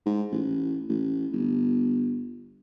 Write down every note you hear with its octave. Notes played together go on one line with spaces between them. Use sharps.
G#2
A1
A1
G1